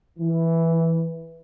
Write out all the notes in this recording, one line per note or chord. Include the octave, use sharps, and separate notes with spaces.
E3